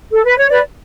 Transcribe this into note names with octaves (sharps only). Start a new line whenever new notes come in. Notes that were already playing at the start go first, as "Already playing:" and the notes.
A4
B4
C#5
B4 D5